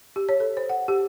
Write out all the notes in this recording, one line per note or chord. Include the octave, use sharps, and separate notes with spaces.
G4
C#5
A4
C5
F#5
G4